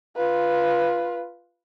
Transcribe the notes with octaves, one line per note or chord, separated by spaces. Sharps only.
F4 B4